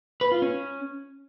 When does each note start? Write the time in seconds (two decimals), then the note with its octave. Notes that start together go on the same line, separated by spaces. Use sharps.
0.21 B4
0.32 F4
0.42 C#4